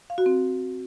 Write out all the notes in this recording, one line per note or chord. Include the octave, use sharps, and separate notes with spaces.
F5
F#4
C4